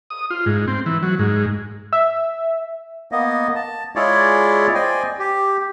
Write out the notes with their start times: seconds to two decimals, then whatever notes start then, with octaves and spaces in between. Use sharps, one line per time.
0.10 D#6
0.30 F4
0.46 G#2
0.68 C4
0.86 E3
1.03 F#3
1.19 G#2
1.93 E5
3.12 A#3 B3 D#5
3.55 A5
3.96 G#3 E4 F4 G#4 C#5 D5
4.75 C5 D5 D#5 G5 G#5
5.19 G4